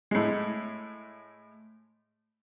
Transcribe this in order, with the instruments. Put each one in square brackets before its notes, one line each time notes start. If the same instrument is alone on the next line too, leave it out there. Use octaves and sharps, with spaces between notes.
[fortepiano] A2 G#3